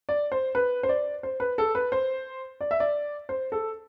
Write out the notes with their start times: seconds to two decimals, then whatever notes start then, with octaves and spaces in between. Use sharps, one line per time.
0.09 D5
0.32 C5
0.55 B4
0.83 C5
0.89 D5
1.23 C5
1.40 B4
1.58 A4
1.75 B4
1.92 C5
2.61 D5
2.71 E5
2.80 D5
3.29 C5
3.52 A4